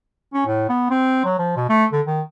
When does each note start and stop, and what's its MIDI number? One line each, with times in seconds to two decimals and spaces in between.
0.34 0.45 61
0.46 0.66 45
0.69 0.91 59
0.91 1.20 60
1.24 1.38 54
1.39 1.55 53
1.56 1.68 47
1.69 1.85 57
1.92 2.01 50
2.07 2.21 51